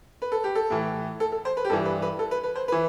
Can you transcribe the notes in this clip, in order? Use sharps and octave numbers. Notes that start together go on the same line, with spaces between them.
B4
A4
G4
A4
A2 E3
A4
A4
C5
B4
G4
G2 E3 A4
B4
B4
A4
B4
B4
C5
E3 B4